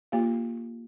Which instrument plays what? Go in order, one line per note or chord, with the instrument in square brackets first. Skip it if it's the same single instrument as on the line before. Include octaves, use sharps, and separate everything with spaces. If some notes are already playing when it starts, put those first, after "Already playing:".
[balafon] A#3 F4 G4 F5